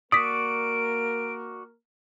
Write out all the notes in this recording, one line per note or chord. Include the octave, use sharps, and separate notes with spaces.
A#3 F#4 A#4 D5 D#6 B6 D7